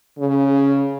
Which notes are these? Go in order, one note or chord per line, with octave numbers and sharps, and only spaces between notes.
C#3